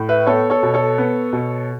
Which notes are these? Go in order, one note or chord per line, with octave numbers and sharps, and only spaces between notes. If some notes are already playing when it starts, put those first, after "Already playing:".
Already playing: A2
B4 E5
B3 A4 C#5
A4 C#5
B2
A4 C#5
B3
B2